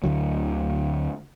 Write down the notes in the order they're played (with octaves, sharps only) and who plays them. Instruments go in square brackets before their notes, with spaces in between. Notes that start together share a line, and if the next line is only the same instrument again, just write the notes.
[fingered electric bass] D2 D3 F#3